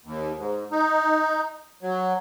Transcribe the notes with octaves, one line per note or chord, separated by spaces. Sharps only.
D#2
G#2
D#4
F#3